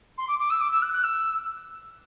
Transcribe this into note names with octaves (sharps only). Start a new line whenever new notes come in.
C6
D6
D6
E6
D6
E6
F#6
F#6
E6